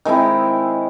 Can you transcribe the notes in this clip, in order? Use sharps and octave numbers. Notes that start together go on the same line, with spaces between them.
D#3 G#3 C4 E4